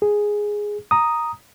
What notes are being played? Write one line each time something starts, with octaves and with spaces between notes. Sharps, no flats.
G#4
A#5 D#6